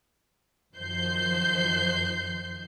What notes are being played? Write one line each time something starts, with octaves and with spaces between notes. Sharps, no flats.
F#2 D#3 F3 C5 G6 C7